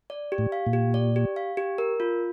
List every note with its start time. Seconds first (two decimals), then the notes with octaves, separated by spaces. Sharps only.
0.10 D5
0.32 G4
0.38 A2
0.52 F5
0.66 A#2
0.73 G4
0.94 D5
1.16 G4
1.36 F5
1.57 G4
1.78 A#4
2.00 F4